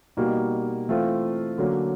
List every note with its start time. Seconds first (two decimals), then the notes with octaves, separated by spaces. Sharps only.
0.17 B2 G3 A#3 D#4 F#4
0.88 E3 A3 C4 F4
1.58 D3 F#3 A#3 C#4